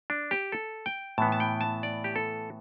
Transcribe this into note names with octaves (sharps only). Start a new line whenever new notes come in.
D4
G4
A4
G5
A2 E3 B3 A5
A5
G5
A5
D5
G4
A4